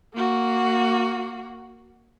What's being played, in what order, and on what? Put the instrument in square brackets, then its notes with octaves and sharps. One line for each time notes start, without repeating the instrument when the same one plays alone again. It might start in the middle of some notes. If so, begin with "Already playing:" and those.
[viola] A#3 F#4